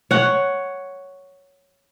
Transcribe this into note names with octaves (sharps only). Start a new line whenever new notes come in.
C#5 F#5